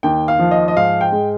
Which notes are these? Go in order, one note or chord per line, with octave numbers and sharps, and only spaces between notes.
D#2 G5
F5
F3
D#5
D#5
G#2 F5
G5
G#3